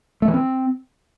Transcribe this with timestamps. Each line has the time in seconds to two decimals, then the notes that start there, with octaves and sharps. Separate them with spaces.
0.22 A3
0.28 E3
0.34 C4